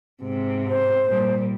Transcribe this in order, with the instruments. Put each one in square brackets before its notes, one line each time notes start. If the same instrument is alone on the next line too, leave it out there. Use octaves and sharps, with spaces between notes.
[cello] G#2 C3
[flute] C5
[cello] A#2 G3